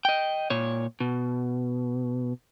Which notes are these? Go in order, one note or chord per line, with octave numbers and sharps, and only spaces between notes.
D#5 G5
A#2 C#5
B2